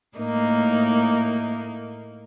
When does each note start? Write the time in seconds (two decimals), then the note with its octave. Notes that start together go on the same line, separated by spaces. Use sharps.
0.18 A2 A#3 D#4